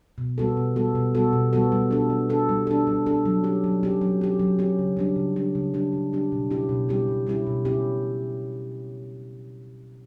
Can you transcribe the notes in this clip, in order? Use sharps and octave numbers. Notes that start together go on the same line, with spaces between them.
B2
G3 B3 F#4 A4
B2
G3 B3 F#4 A4
B2
G3 B3 F#4 A4
B2
G3 B3 F#4 A4
G3
D4 A4
G3
D4 A4
G3
D4 A4
G3
D4 A4
F#3
C#4 G4
F#3
C#4 G4
F#3
C#4 G4
F#3
C#4 G4
C#3
G3 D4 G4
C#3
G3 D4 G4
C#3
G3 D4 G4
C#3
G3 D4 G4
B2
G3 C#4 E4 G4
B2
G3 C#4 E4 G4
B2
G3 C#4 E4 G4
B2
G3 C#4 E4 G4